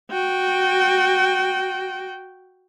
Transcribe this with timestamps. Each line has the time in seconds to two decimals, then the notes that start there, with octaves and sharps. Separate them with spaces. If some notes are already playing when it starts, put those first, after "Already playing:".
0.11 F#4 G5